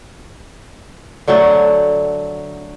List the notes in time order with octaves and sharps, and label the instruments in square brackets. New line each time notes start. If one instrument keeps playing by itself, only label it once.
[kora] D3 F#3 A3 F#5